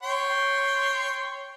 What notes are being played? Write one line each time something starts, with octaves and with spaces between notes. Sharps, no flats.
C#5 G5 C6